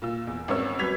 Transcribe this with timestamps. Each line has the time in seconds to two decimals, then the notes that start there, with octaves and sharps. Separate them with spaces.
0.02 A#2 F4 E6
0.27 E2
0.48 G#1 C4 C#4 A#4 C#5 E6
0.79 F#3 B4 G6 G#6 B6 F7